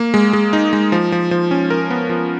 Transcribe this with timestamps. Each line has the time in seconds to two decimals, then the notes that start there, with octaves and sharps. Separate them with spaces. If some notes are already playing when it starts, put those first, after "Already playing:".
Already playing: A#3
0.14 G#3
0.33 G#3
0.53 D#4
0.73 G#3
0.92 F3
1.12 F3
1.31 F3
1.51 C#4
1.70 A#4
1.90 B3
2.09 F3